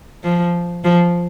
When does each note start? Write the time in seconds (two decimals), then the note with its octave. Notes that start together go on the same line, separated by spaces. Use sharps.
0.24 F3
0.84 F3